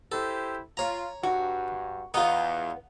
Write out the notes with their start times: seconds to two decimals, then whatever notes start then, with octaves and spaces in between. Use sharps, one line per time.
0.12 E4 G4 A4 C5
0.77 F4 C#5 A#5
1.23 G2 F#4
2.14 E2 B3 D#4 F4